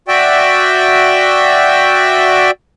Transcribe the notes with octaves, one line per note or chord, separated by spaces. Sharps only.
F#4 D5 E5 G5